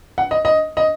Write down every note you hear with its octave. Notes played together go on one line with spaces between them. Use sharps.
F#5
D#5
D#5
D#5